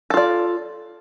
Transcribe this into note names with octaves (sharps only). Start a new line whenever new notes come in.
F4 A4 D5